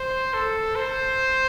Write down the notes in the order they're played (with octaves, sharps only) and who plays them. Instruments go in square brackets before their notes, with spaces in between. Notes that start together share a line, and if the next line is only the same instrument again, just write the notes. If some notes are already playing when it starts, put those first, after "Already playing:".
Already playing: [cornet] C5
A4
C5